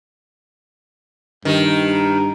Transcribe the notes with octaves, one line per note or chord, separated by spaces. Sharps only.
G2 D#3